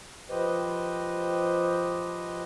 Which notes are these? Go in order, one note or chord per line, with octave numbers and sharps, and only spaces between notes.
F3 G4 B4 C5 D#5